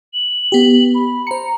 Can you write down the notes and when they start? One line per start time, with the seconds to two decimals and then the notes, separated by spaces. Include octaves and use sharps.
0.14 F#7
0.52 B3 G4
0.95 B5
1.27 C5 A#5 C#7